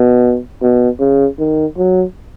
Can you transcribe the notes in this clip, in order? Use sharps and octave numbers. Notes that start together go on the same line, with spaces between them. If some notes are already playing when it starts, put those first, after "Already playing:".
Already playing: B2
B2
C#3
D#3
F#3